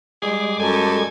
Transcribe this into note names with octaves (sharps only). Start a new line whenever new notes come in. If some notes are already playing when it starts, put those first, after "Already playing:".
G3 G#3 G#4 D6
F#2 A4 G#5